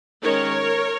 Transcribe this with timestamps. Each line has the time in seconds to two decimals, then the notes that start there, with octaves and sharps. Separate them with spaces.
0.23 D#3 G#3 C#4 A#4 C#5